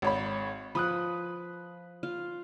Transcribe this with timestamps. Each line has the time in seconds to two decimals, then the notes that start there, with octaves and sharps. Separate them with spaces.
0.02 G#1 C#5 B5
0.75 F3 B4 B5 D#6 F#6
2.03 F4 F5